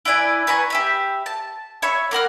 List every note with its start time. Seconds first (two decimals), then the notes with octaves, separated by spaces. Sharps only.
0.05 E4 B4 D5 G#5
0.47 B4 G#5 A#5 C#6
0.70 G4 E5 B5
1.26 A5
1.82 C#5 E5 B5 C#6
2.11 A#3 A#4 F#5 F6